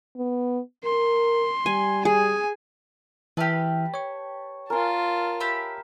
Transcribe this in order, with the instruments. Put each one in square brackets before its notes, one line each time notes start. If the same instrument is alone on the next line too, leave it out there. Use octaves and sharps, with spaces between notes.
[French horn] B3
[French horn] A#4 [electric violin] C6
[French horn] G3 [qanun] G#5
[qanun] G#4 [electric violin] G#5
[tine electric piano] E3 E5 F6 [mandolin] G4 B4 [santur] G5 A5
[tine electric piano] C#5 C#6
[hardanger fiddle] F4 A5 [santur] A#4 G#5 C6
[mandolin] G4 E5 B5